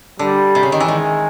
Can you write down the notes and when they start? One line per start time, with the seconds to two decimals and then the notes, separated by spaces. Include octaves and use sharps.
0.19 D3 G3
0.55 C3
0.63 C#3
0.72 D#3
0.80 E3
0.88 D#3 G#3